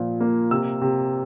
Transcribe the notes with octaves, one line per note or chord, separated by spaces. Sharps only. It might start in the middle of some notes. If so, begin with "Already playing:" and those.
Already playing: A#2 F3
A#3
C3 E6
C3